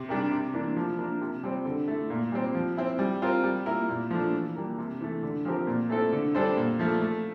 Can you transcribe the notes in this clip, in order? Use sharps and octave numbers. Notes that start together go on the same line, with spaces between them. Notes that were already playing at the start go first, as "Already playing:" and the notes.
Already playing: C3
G3 D4 G4 A#4
C3
E3 A#3 D4
F3
A#3 D4 F4 A#4
C3
G3 C4
D3
A3 E4
A#2
G3 C4
F3
C4 E4
G3
C4 F4 A#4
G3
A#3 E4 A#4
A#2
F3 A3 D4
E3
G3 A#3
C3
E3 A3
D3
F3 C4 G4 A#4
A#2
A3 C4 E4 A4
D3
G3 D4 A4 C5
A#2
F3 A3
A3